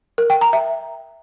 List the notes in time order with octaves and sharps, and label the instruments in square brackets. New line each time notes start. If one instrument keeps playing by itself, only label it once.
[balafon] A#4
G5
A#5
E5